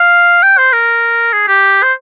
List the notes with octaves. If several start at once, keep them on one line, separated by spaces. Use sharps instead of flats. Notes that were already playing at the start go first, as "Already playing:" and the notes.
Already playing: F5
G5
C5
A#4
G#4
G4
C5